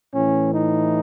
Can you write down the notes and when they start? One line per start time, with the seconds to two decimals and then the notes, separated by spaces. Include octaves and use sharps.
0.12 A2 E3 C#4
0.54 D#4